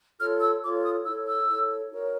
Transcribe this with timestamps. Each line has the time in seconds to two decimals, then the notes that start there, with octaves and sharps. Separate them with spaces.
0.19 F4 A4 C#5 F6
0.41 E6
0.62 F4 A4 C#5 D6
0.83 D#6
1.04 E4 A4 C#5 E6
1.26 E6
1.47 E4 A4 C#5
1.90 D#4 F#4 A#4 C#5